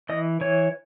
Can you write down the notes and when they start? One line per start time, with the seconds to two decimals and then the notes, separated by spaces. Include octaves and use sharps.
0.09 E3 D#5
0.41 E3 C#5